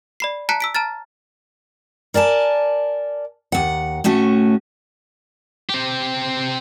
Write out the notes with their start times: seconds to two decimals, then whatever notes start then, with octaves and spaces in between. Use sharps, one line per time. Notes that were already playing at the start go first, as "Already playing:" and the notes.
0.20 D5 B5 C7
0.49 A5 A#5 F#6 B6 C#7
0.60 E6 B6 D7
0.75 A5 A#5 F6 A6
2.14 A#4 D5 G#5 A5
3.52 D#2 F#5
4.04 A2 A3 C#4 F#4
5.69 C4 G4